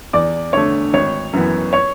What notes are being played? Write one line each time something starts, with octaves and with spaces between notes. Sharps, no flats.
E2 D5 D6
D3 A3 C#5 C#6
G#1 C#5 C#6
F#2 E3 B3
C#5 C#6